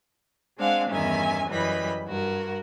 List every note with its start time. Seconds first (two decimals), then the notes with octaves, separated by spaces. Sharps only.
0.58 G#3 C4 D4 F5 F#5 G#5
0.90 E2 G2 D#3 C#4 E5 G#5
1.48 F#2 E3 G3 D#5 B5
2.06 G2 F#4 A#4